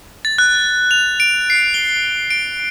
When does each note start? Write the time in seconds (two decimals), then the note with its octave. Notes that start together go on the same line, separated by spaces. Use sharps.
0.25 A6
0.38 F#6
0.91 F7
1.20 D7
1.50 C7
1.74 G7
2.31 D7